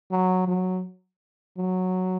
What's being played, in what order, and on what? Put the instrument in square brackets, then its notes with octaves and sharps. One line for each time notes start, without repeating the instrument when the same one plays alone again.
[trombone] F#3
F#3
F#3